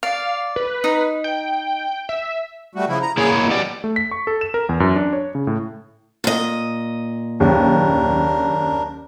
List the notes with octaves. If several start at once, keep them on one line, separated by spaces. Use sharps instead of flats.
D5 F5
B4
D#4
G5
E5
G3 A3 F#4
C#3 F3 E4
A#5
A#3 E4 G#4 C#5
B2
F#3 G4 D5
A3
B6
C#6
A4
E7
A#4
E2
F#2
D4
C#5
C#3
A2
A#2 D#5
F#1 D#2 D4 A#4